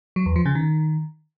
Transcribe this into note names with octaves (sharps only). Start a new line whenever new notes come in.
F#3
E2
F3
C#3
D#3